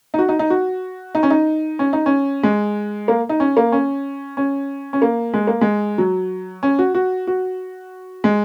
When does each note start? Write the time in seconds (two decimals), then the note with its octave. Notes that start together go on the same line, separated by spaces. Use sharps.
0.14 D#4
0.19 F#4
0.29 D#4
0.39 D#4
0.50 F#4
1.15 D#4
1.23 C#4
1.30 D#4
1.79 C#4
1.93 D#4
2.06 C#4
2.43 G#3
3.08 A#3
3.29 D#4
3.40 C#4
3.57 A#3
3.72 C#4
4.37 C#4
4.93 C#4
5.02 A#3
5.34 G#3
5.47 A#3
5.61 G#3
5.98 F#3
6.63 C#4
6.79 F#4
6.95 F#4
7.27 F#4
8.24 G#3